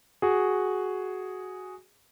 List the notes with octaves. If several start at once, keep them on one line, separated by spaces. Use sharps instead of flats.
F#4 G#4